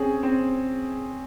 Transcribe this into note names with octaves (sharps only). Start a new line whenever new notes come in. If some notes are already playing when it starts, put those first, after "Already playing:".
Already playing: C4 C#4 G#4
C4